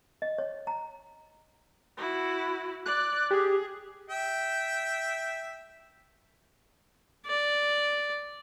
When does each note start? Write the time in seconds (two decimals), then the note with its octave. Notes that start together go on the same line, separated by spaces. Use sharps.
0.22 D#5
0.38 C#5
0.67 A#5
1.98 E4 F#4
2.86 D5 F#6
3.31 G4 G#4
4.10 E5 G5
7.26 D5